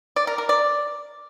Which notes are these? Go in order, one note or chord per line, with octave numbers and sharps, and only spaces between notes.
D5
A#4
A#4
D5